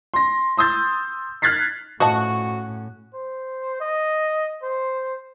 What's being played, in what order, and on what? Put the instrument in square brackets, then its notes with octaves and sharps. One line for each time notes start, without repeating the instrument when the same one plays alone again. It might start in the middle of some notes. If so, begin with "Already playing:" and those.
[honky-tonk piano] C6 A#6
C6 D#6 E6 G6 A6
F6 F#6 G#6 A6 B6 C7
[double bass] A2 C#4 [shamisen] F3 D#5 A5 [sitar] F#4
[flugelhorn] C5
D#5
C5